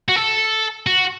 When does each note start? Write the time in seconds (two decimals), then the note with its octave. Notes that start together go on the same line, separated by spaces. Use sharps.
0.09 F#4
0.16 A4
0.87 F#4